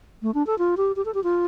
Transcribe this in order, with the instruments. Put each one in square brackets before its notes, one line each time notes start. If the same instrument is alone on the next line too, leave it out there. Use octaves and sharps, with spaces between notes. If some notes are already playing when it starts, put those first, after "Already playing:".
[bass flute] A3
D4
A4
F4
G4
G4
A4
G4
F4